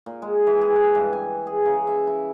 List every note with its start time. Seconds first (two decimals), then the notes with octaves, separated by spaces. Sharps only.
0.06 A#2
0.22 G#3
0.47 E3
0.61 G#4
0.76 B4
0.95 G2
1.13 G#5
1.47 G#4
1.66 C#3
1.87 E5
2.07 E4